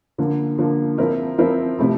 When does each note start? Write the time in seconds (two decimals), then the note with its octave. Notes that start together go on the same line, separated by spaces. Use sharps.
0.18 D3 F3 A#3
0.58 D3 F3 A#3
0.98 F3 C4 E4 A#4
1.38 F3 C4 E4 A#4
1.79 C3 F3 A3 E4